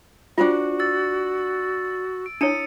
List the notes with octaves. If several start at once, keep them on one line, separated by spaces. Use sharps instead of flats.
D4 D#4 F4 F#4 C5 G5
E6 A6
D7
D4 E4 C#5 D#6 C#7 D#7